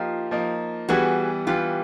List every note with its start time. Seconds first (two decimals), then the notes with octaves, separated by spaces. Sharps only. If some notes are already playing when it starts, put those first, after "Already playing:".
Already playing: F3 A#3 D#4 F4 G4
0.31 F3 A#3 D#4
0.89 E3 G3 B3 F#4 G#4
1.47 E3 G3 B3 F4 G4